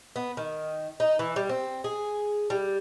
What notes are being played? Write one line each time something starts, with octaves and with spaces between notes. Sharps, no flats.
B3
D#3
D#4
E3
G3
C4
G#4
G3